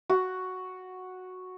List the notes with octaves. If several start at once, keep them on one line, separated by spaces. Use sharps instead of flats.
F#4